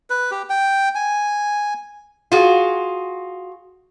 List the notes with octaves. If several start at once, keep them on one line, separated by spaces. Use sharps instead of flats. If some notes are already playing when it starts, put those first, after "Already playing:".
B4
G4
G5
G#5
F4 F#4 G#4